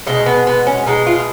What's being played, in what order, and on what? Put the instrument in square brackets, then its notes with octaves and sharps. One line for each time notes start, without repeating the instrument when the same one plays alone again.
[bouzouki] B2 G#3 D#4
B3
B3
C#4
B2 G#3 D#4
F4